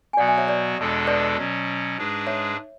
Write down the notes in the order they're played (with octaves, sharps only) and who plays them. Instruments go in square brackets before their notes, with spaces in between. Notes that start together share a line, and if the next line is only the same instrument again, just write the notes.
[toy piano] G#5
[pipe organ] B2 F#3 B3 F#4 [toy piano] D5 F#5
[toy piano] E5 G#5
C#5 E5
B4 D5
[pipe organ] E2 B2 G#3 D4 A4
[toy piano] B4 D5
[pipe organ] B2 F#3 C#4
G#2 G#3 D4 G#4 B4
[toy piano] C#5 E5